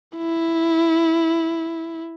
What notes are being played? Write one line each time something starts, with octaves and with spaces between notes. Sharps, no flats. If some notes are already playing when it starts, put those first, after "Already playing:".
E4